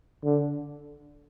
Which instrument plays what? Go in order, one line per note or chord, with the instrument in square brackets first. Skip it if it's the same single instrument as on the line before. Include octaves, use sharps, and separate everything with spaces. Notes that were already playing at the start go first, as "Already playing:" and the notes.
[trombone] D3